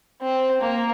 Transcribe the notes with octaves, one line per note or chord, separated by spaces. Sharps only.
C4
A#3